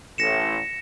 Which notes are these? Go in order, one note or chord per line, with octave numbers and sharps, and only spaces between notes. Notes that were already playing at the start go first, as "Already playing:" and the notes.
A1 A2 A#6 C#7 E7